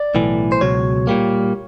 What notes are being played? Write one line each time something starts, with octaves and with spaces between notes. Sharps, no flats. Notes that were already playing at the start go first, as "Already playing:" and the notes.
Already playing: D5
B1 A2 E3
C5
C#2 B2 F#3 C#5
A#2 G3 A#3